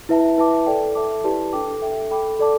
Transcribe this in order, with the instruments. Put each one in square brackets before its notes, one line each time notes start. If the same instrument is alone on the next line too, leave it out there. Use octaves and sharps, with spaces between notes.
[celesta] E4 B4 E5 A5
E4 B4 E5 A5 D6
A4 D5 G5
A4 E5 A5 D6
E4 G4 B4 D5 A5
D4 A4 G5 D6
A4 E5 G5
A4 G5 B5 D6
A4 D5 A5 D6